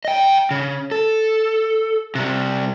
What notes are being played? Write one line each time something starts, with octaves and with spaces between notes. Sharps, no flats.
D#5 G5
C#3
A4
C3 G3